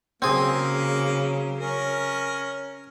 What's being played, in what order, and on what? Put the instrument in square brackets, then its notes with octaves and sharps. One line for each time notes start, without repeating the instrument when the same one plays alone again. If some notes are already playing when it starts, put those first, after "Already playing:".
[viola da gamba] C#3 F#3 [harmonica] A#3 [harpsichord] C4 G#4
[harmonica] C#4 A#4